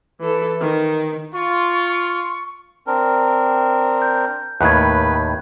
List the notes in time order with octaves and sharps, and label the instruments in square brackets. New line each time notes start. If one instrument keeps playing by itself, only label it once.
[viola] E3 A4
D#3
[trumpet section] F4 [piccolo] C#6
[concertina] C4 D4 A#4
[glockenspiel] G6
[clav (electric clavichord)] D#2 A2 D#3 [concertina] B4 [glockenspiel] F#6 G#6